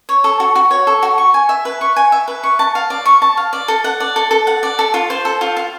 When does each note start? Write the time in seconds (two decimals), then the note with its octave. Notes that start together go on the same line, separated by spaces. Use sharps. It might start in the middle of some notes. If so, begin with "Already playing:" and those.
0.09 C#5
0.24 A4
0.40 F#4
0.55 F#4
0.71 C#5
0.87 A4
1.02 F#4
1.18 C#6
1.34 G#5
1.49 E5
1.65 B4
1.81 C#6
1.96 G#5
2.12 E5
2.28 B4
2.43 C#6
2.59 A5
2.75 F5
2.90 D5
3.05 C#6
3.22 A5
3.37 F5
3.53 D5
3.68 A4
3.84 F#5
4.00 D5
4.16 A4
4.31 A4
4.47 F#5
4.63 D5
4.79 A4
4.94 F4
5.10 C5
5.25 A4
5.41 F4
5.57 F4